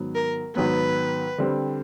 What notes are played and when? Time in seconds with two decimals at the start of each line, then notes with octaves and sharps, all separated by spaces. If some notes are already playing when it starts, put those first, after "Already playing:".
Already playing: G#2 D#3 F#3 B3
0.15 A#4
0.56 G#2 D#3 F#3 B3 B4
1.38 D3 G3 C4